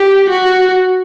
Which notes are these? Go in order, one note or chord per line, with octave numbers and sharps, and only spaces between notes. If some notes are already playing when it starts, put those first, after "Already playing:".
Already playing: G4
F#4